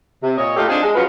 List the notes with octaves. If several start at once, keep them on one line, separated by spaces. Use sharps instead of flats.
C3
A#2 C#5 D#5
A3 A#3 D#4 F4 G4 A4
C4 D4 D#4 F4 G#4
G#3
F3 F#3 C#4 F4 F#4 B4